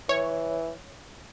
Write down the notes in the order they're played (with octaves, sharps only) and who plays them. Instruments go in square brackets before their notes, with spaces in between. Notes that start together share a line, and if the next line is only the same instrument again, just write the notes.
[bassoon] E3 [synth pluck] C#5